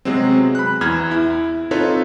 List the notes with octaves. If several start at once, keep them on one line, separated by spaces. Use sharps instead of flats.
C3 F#3 G#3 B3 C4
B5 F#6
E2 B5 F6 G#6
E4
C4 D#4 F4 A4 B4 C#5